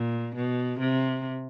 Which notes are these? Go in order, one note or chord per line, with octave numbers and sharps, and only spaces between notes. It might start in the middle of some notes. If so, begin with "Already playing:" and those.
Already playing: A#2
B2
C3